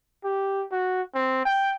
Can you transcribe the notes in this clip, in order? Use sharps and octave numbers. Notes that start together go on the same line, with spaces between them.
G4
F#4
C4
G5